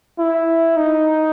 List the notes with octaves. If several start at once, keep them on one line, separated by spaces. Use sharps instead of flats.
E4
D#4